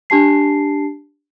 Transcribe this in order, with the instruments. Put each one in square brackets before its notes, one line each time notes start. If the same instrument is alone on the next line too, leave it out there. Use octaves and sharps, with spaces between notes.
[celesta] D4 G4 A5 C7